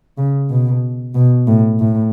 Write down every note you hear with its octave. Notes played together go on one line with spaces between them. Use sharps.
C#3
B2
B2
A2
A2